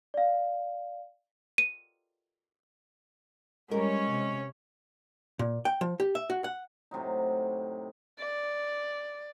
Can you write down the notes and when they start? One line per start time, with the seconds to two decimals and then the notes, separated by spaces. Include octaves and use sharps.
0.14 D5 F5
1.58 D#7
3.71 G3 G#3 C#4 A#4 C#5
4.11 C3
5.39 A#2
5.65 G5
5.81 F3
6.00 G4
6.15 E5
6.30 F#4
6.44 F#5
6.91 A2 C3 F#3 D#4
8.19 D5